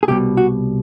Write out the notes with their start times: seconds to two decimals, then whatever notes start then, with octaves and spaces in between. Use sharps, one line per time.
0.03 G#4
0.08 C2 B2 G3 G4
0.37 F#4